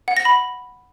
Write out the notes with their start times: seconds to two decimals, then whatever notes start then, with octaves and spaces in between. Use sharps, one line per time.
0.08 F#5
0.17 A#6
0.25 B5